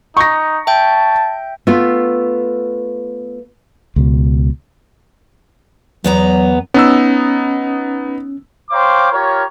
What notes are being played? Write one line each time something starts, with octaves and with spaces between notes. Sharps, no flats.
D#4 C#6 A#6
E5 G5 A5 G6
A3 B3 F4
C#2 B2
E2 F#3 B3 A#5
B3 C#4 D#4 E6
C5 C#5 F5 G5 A#5 D6
F4 G4 A#4 C#5